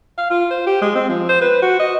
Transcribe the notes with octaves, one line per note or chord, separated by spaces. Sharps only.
F5
F4
C5
G4
G#3
C4
F3
C5
B4
F#4
D#5